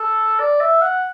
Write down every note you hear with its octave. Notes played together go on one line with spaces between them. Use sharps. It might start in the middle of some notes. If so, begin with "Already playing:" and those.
Already playing: A4
D5
E5
F#5